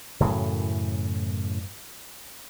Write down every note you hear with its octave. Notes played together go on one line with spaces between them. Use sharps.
F#2 A2 C#3 E3